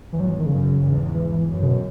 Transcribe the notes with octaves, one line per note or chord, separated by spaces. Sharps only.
E2 G#2 E3
F#3
E3
D#3
F#2 C#3
E2 G#2
E3
E3
F#2
C#3
B2